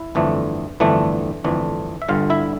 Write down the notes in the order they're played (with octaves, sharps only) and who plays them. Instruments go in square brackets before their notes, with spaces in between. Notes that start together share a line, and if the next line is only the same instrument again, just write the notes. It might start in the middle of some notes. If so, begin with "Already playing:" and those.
Already playing: [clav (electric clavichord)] E4
G1 F2 E3 A3 D4
G1 F2 E3 A3 D4
G1 F2 E3 A3 D4
E5
G1 G2 D3 F4 F5
E4 E5